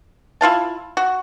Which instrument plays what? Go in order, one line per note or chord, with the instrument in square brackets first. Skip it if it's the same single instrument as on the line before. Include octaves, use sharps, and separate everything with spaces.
[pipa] E4 F4 F5 A5
F#4